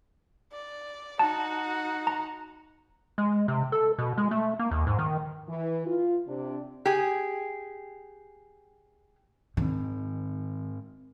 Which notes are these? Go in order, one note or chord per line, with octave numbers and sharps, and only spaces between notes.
D5
D#4 F#4 A5
A#5
G#3
C3
A4
B2
G#3
A3
A#3
D#2
G#2
D#3
E3
F4
C3 D4
G4 G#4
G#2 D#3 C4